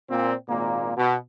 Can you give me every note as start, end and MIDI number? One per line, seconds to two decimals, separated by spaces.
0.10 0.34 46
0.10 0.34 60
0.49 0.92 32
0.49 0.92 46
0.49 0.92 58
0.97 1.17 47